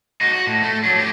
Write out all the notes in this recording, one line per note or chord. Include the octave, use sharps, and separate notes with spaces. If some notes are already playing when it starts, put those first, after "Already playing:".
D#4 F#4
F#4
A2
A3
F#3 D4
A2 G4